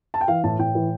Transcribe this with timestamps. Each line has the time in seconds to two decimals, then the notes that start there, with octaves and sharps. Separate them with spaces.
0.14 A5
0.21 G5
0.28 E3 F5
0.44 A2 A5
0.59 A2 G5
0.75 E3